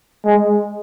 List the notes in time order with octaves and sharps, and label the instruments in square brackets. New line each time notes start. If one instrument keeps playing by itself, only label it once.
[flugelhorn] G#3